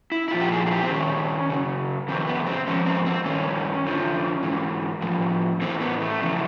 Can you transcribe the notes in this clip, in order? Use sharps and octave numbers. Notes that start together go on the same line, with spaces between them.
E4
E4
A#2 F3 F4
G4
G#4
G#4
G4
C4
G2 D#3 C#4
F#2 C#3
F2 C3 D#3 C4
B3
C4
G#2 F3 C#4
C4
C4
G2 D#3 C#4
F2 D3 F3
G#2 E3
A2 F3
A2 E3 C4
B3
A3
F2 C#3 E3